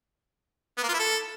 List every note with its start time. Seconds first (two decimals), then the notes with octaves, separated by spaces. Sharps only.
0.78 B3
0.83 A#3
0.88 F4
0.94 E4
0.99 A4